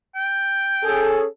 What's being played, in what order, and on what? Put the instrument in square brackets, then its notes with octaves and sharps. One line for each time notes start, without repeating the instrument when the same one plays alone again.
[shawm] G5
[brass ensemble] C#4 G#4 A4